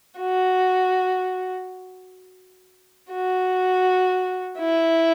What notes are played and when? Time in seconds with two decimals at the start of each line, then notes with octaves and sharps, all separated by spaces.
0.19 F#4
3.11 F#4
4.58 E4